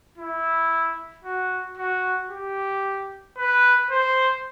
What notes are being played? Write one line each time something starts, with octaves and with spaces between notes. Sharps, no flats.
E4
F#4
F#4
G4
B4
C5